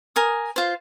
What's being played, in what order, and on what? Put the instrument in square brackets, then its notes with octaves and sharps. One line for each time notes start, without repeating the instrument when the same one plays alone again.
[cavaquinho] A#4 G#5 D#6
F4 C5